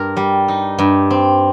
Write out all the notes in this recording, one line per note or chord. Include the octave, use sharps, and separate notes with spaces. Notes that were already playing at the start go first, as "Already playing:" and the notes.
Already playing: G2 A#4
G3
D#4
G2
C4